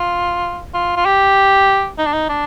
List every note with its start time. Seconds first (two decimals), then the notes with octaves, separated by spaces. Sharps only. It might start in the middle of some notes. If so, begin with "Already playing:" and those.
Already playing: F4
0.74 F4
0.97 F4
1.05 G4
1.98 D#4
2.06 D4
2.13 D#4
2.29 D4